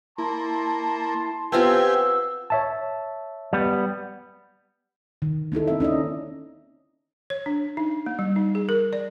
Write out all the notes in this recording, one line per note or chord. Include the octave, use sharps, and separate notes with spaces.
A#3 E4 A5 C6
B3 C4 F4 G4 G#5 E6
C#5 E5 A5
G3 B3
D#3
A#3 D#4 E4 A4
C4 E5
C#4 D#4 D5 D#5
C#5
D4
D#4
A#3
G3
D#4
G#4
A#4
D5